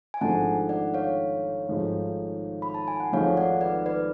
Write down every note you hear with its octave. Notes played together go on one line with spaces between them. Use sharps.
G#5
G#1 G#2 F3 A3 D4 F#5 A5
D5 F#5
C#5 F5
G#1 G#2 F3 A3
B5
A5
G#5
F#5
G#1 G#2 F3 A3 C#5 F5
D5 F#5
B4 D5
B4 D5